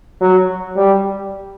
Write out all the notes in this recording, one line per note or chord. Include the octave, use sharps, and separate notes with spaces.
F#3
G3